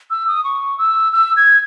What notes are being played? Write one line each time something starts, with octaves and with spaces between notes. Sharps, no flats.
E6
D#6
C#6
E6
E6
G#6